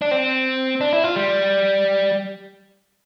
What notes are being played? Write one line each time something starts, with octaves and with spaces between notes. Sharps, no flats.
D4
C4
D4
E4
F4
G3